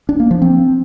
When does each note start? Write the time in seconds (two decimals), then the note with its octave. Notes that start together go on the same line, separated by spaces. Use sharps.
0.09 D4
0.20 A#3
0.31 F3
0.42 C4